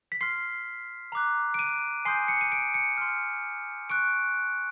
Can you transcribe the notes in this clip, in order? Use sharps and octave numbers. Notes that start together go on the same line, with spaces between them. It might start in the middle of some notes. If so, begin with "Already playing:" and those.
B6
C6 F6 C7
A#5 D6 F#6
D7
D#7
G#5 C6 D#6 G6 C7
C#7
D#7
D7
C#7
C6 F6
C#6 F#6 D7